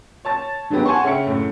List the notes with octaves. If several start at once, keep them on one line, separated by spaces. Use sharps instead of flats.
C#5 A5 A6
D#3 F#3 G#3 B3 G4
F#5 G#5 A5 C6 C#6
C#3 C#4 E5 G5 C#7
F#2 A2